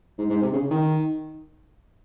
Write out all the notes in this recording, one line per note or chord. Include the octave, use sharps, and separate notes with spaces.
G#2
G#2
C3
C#3
D#3